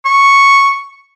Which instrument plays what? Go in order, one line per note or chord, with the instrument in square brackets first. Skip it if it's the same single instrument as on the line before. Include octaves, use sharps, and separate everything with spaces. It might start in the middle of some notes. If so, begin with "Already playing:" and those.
[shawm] C#6